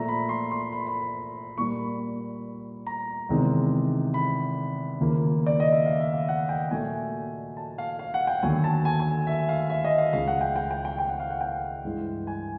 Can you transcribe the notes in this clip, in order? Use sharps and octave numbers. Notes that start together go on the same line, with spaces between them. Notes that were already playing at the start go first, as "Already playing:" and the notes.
Already playing: A#2 F3 A3 A#5
B5
C6
C6
B5
B5
B5
A#2 G3 A#3 C#6
B5
A#5
E2 C3 D#3 G#3
B5
D#2 C#3 F3 A#3
D5
D#5
E5
F5
E5
F5
F#5
G5
A#2 F#3 A3 G#5
A5
F5
F5
F#5
G5
D#2 D3 F#3 G#5
A5
G#5
G#5
E5
F5
E5
D#5
F5
C#2 C#3 F3 F5
F#5
G5
G5
G5
G5
G5
F#5
F5
F#5
G5
G2 E3 G#3
G#5